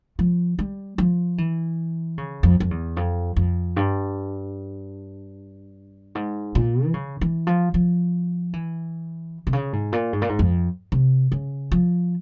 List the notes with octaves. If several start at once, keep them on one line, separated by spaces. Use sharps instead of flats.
F3
G3
F3
E3
C#3
F2
F2
E2
F2
F2
G2
G#2
A#2
E3
C#3
E3
F3
F3
E3
C3
C#3
G#2
A#2
G#2
A#2
G#2
F2
C3
C#3
F3